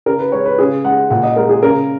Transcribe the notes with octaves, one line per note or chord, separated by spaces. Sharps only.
C#3 A#4
B4
G#3 C#5
B4
C#3 G#4
G#3 F#5
A#2 F#5
D#5
G#3 A#4
G#4
C#3 A#4